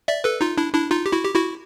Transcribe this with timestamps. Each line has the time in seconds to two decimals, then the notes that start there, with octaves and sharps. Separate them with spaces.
0.08 D5 E5
0.24 A4 B4
0.41 D#4 F4
0.57 D4 E4
0.74 D4 E4
0.91 D#4 F4
1.06 G4
1.12 E4 F#4
1.24 G4
1.35 E4 F#4